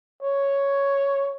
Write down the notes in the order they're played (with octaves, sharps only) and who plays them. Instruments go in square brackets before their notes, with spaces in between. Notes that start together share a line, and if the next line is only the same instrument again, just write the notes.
[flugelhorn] C#5